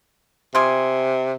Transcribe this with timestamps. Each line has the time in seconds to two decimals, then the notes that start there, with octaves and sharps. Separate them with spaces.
0.55 C3 F4 G4 G#4